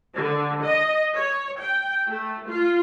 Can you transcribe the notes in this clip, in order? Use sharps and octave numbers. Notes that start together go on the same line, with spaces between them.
D3
D#5
C#5
G5
A3
F4